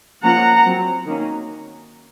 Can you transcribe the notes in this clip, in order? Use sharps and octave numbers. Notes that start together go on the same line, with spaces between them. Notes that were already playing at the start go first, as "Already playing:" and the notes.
F3 A#3 C#4 F#5 A#5
F#3 C4
D#3 A#3 C#4